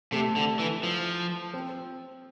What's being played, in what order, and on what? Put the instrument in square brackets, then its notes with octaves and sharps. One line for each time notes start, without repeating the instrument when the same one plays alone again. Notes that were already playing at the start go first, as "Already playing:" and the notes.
[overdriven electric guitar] C3 [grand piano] A3
[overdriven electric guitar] D3
E3
F3
[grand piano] C4